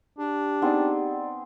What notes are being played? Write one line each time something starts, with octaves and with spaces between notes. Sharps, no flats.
D4 G4
B3 C4 D#4 G#4 D5